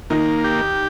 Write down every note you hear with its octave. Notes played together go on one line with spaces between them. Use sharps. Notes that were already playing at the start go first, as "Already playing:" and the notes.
D#3 A#3 D#4
G4